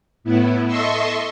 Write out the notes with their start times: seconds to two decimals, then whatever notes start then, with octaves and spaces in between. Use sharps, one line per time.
0.24 A2 B3 E4
0.67 A4 D#5 E5 C6 C#6